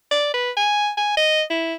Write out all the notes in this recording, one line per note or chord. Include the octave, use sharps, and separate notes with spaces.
D5
B4
G#5
G#5
D#5
E4